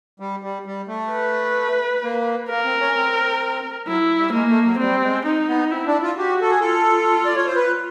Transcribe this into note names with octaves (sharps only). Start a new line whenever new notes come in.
G3
G3
G3
A3
B4
A#3
A#3 A#4
C4
C#4
C4
F#3 E4
G3
G#3 A#3
A3
F#3
G3 C4
G#3
D#4
B3
C4 E4
D4
F4
F#4 G4
A4
G#4
F4 A4
D5
C#5
C5
B4